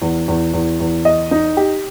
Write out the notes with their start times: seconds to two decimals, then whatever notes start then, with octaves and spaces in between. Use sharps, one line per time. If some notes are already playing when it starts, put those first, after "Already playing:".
0.02 E2
0.28 E2
0.54 E2
0.80 E2
1.05 D#5
1.31 D#4
1.57 G4